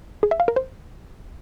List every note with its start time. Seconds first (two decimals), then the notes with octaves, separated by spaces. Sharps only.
0.23 G#4
0.31 E5
0.40 F5
0.48 A#4
0.56 C5